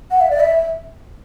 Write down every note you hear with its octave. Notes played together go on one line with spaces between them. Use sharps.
F#5
E5
D5
E5